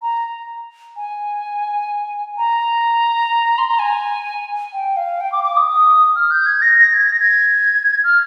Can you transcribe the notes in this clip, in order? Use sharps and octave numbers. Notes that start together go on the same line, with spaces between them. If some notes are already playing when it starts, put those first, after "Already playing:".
A#5
G#5
A#5
C6
A#5
G#5
G5
F5
G5
D6
D6
D#6
D#6
F6
G6
G#6
A#6
A#6
G#6
A#6
G#6
F6